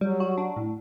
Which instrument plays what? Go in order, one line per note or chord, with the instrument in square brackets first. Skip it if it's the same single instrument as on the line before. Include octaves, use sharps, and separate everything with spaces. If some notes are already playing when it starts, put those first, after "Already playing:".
[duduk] F#3 [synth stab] G3
[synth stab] F#4
D4
A2